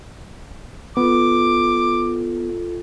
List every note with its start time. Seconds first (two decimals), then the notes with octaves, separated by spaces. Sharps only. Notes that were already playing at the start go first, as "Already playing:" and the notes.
0.97 B3 F4 A4 D6